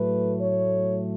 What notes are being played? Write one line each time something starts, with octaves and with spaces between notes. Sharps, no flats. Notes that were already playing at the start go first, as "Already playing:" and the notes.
Already playing: A2 F#3 A3 B4
C#5